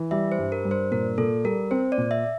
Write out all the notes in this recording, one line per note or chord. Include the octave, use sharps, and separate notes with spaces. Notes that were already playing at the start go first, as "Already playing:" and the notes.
Already playing: E3
G3 E5
C5
G2
A#4
G2
C5
A#2 A#4
A#2 A4
G3 A#4
C4 C5
D5
A#2
E5